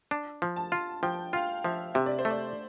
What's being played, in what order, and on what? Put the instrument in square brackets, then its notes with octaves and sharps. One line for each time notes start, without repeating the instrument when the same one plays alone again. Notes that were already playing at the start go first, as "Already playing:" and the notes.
[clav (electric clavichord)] D4
F3
[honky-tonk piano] A5
[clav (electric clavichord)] F4
[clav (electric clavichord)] F3 [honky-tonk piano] G5
[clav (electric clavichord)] F4 [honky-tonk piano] F5
[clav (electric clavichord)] F3 [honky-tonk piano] E5
[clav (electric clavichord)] C3 [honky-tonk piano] E5
[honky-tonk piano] D5
C5
[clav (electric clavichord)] A3
[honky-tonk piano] D5